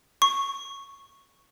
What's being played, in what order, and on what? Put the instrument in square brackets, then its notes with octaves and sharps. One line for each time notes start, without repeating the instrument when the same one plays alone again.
[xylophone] C#6